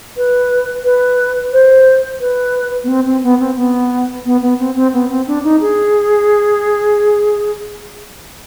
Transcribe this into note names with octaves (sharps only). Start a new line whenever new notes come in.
B4
B4
C5
B4
B3
C4
C4
B3
C4
B3
B3
B3
C4
C4
B3
C4
D4
D#4
G#4